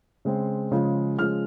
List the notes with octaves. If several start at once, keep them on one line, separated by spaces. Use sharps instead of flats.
C#3 G#3 C4
C#3 F3 G#3
C#3 F3 G#3 F6